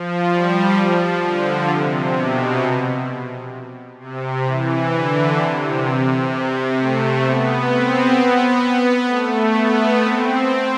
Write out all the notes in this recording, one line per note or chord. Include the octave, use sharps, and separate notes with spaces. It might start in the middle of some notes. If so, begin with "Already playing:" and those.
Already playing: F3
G3
F3
D3
C3
B2
C3
E3
D3
C3
C3
A3
B3
C4
B3
A3
B3
C4